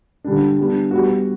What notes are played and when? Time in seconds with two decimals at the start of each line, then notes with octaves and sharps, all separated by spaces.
0.24 D3 G3 D4
0.58 G3 B3 D4
0.91 G3 B3 F#4